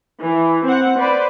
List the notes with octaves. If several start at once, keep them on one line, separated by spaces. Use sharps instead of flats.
E3
C4 F#5
B4 C5 D5